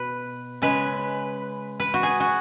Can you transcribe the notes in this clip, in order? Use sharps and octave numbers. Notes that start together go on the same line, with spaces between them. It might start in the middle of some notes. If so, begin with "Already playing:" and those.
Already playing: B2 B4
C#3 G#3 B4
B4
F#4
G#4
F#4